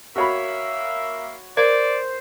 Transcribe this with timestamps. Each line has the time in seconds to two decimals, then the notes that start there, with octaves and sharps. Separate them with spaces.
0.16 A#3 F#4 C#5 E5 B5
1.57 A#4 C5 D5